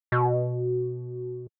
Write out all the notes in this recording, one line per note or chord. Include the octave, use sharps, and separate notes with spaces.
B2